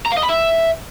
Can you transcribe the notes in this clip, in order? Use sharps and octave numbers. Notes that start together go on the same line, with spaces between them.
A#5
F5
D#5
B5
E5